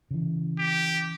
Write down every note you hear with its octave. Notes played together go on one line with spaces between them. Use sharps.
C#3 E3
G4